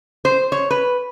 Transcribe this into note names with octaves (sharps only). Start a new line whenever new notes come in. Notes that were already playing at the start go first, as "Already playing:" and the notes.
C5
C#5
B4